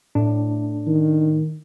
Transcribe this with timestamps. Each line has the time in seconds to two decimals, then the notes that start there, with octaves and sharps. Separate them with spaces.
0.15 A2 D4
0.87 D#3